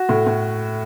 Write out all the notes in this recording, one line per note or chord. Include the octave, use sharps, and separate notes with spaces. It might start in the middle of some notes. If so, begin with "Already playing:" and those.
Already playing: F#4
A2
A2